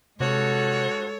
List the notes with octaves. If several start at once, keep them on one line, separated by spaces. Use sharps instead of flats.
G2 C3 G#3 F#4 A4 C#5